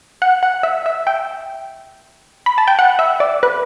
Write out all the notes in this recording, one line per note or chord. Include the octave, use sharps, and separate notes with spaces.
F#5
F#5
E5
E5
G5
B5
A5
G5
F#5
E5
D5
B4